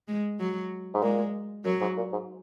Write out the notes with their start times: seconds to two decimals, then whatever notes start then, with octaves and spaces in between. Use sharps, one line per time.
0.08 G#3
0.40 F#3
0.94 G#2
1.02 A#2 G#3
1.65 F#2 F#3
1.81 G#2
1.97 A#2
2.12 G#2